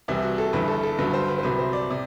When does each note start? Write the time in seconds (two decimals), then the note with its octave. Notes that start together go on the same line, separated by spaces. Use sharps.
0.08 C2 C3 E3 G3 E4
0.23 F#4
0.38 A4
0.53 G1 G2 E3 B4
0.68 A4
0.83 A4
0.98 G1 G2 D3 F#3 B4
1.13 C5
1.28 B4
1.38 C5
1.43 C2 C3 F#3 B4
1.59 C5
1.73 D5
1.90 C3